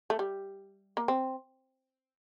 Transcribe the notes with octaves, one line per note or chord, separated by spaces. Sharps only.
A3
G3
A#3
C4